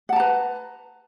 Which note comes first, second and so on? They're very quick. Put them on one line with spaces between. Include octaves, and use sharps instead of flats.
F#5 A5 A#5 B4